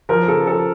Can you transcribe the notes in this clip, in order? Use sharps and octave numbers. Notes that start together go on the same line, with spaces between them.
F3 A#4
C#3 A4
F3 A4